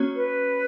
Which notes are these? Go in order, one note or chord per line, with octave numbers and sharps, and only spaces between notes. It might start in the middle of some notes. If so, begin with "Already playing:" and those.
Already playing: A#3 C#4 F#4 C#5
B4